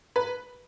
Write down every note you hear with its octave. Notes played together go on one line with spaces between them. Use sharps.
B4